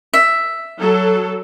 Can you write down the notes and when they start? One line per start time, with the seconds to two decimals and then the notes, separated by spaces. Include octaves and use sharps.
0.14 E5
0.78 F#3 A4